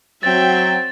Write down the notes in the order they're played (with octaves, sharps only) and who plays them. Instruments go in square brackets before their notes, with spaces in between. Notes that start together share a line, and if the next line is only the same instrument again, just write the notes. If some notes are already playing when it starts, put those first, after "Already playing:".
[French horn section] F#3 [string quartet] C4 [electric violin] E5 G5 [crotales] A6